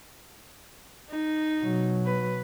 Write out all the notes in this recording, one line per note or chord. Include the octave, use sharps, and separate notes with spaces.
D#4
B2 F#3
B4